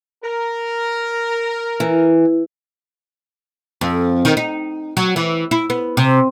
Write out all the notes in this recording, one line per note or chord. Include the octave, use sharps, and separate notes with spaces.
A#4
E3
F2
D#3
D#4
F#3
E3
E4
B3
C3